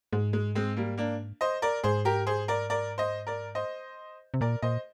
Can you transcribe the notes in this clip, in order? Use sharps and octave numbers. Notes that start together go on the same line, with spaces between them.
G#2 G#3
G#3
G#3 C4
G3 A#3
A#3 D4
C5 D#5
A#4 D5
G#2 G#4 C5
G4 A#4
G#4 C5
A#4 D5
A#4 D5
C5 D#5
A#4 D5
C5 D#5
C3
A#2 A#4 D5
A#2 C5 D#5